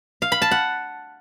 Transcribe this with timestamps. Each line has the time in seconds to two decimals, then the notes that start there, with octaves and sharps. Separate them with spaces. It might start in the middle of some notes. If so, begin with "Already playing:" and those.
0.22 F5
0.32 B5
0.42 A5
0.51 F#5